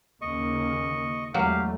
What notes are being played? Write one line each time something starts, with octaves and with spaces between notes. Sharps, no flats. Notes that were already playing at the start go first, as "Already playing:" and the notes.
D#2 C#3 A#3 D#5 C#6
E2 F#3 G#3 A3 G4 F5